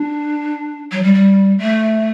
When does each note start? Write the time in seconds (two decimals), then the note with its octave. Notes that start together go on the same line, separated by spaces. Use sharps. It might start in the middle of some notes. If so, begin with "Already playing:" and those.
Already playing: D4
0.92 F#3
1.03 G3
1.14 G3
1.58 A3